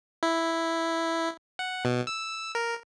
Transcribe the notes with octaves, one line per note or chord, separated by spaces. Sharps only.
E4
F#5
B2
E6
A#4